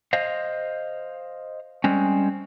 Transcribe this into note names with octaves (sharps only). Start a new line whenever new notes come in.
C5 D#5 F5
G3 G#3 C4 C#4